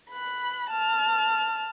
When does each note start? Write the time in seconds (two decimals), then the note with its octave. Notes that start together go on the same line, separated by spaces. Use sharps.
0.11 B5 F#6
0.69 A5 F6